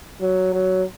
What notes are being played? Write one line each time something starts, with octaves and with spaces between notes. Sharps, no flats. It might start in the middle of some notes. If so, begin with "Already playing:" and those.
F#3
F#3